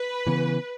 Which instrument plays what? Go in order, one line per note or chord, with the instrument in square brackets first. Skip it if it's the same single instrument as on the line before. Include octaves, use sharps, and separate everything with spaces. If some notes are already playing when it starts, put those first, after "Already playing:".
Already playing: [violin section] B4
[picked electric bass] C#3 E3 B3